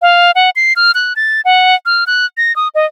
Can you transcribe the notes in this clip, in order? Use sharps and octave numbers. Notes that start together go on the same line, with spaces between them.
F5
F#5
C7
F6
F#6
A6
F#5
F6
F#6
A#6
D#6
D#5